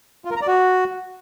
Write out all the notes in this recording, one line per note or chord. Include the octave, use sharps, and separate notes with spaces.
F4
A#4
A#5
D5
F#4